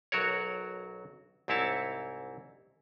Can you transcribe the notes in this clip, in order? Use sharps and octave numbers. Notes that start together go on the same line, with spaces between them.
B1 F#3 F#4 A#4 C#5
C2 G#2 C4 E4 C#5 A5